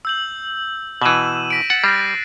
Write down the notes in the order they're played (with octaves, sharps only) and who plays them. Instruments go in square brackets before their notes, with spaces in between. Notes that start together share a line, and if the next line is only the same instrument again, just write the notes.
[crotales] E6 G6 F#7
[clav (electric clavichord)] B2 E3 [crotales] D#7 E7 F#7
[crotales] A#6 B6 D7
[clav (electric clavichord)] F#5 [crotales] A6
[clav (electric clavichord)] G3 [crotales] F#6 A#6 C7